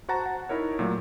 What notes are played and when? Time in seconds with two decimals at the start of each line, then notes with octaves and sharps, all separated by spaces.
0.09 F#4 C5 F#5 A5 A#5 A6
0.26 F#5
0.49 D#4 E4 A#4 C#5
0.79 A#2 F#3 A3